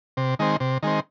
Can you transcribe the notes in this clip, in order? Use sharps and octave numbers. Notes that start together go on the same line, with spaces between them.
C3
D#3 G#3 C4
C3
D#3 G#3 C4